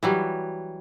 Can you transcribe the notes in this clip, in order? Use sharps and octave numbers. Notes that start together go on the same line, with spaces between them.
E3 F#3 G3